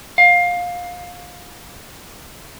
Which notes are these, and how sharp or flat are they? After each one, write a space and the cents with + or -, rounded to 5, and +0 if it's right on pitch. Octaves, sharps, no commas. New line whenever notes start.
F5 +20